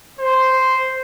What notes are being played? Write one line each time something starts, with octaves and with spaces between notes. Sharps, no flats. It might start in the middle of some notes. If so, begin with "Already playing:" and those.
C5